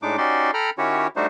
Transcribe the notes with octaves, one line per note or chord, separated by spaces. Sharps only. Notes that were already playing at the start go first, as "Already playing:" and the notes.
A2 G#3 D4 D#4 D6
C#4 D#4 F#4 G4 D5 C6
A4 G5 A#5 B5 F6
D#3 C#4 E4 F#4 G4 C#5
G3 A3 D4 D#4 F#4 C5